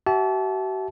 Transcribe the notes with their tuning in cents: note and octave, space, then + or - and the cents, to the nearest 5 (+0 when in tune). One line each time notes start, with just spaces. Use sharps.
F#4 +45 E5 +0 A5 -30